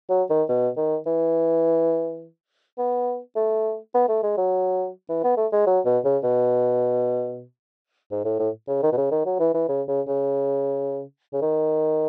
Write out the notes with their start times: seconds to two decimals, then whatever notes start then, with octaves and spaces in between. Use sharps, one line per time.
0.10 F#3
0.30 D#3
0.49 B2
0.77 D#3
1.06 E3
2.78 B3
3.36 A3
3.94 B3
4.08 A3
4.23 G#3
4.37 F#3
5.09 E3
5.24 B3
5.37 A3
5.52 G#3
5.66 F#3
5.85 B2
6.04 C#3
6.23 B2
8.11 G#2
8.24 A2
8.39 A2
8.68 C#3
8.83 D#3
8.92 B2
8.97 C#3
9.11 D#3
9.26 F#3
9.39 E3
9.54 E3
9.69 C#3
9.88 C#3
10.07 C#3
11.33 C#3
11.42 D#3